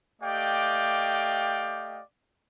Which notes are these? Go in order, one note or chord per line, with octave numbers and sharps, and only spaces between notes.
A3 G4 D5 D#5 F5 G5